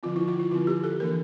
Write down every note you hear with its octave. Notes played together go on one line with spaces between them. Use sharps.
D3 F3 C4 F4
E4
F4
E4
D3 F3 C4 F4
G4
A4
E3 A#3 D4 A#4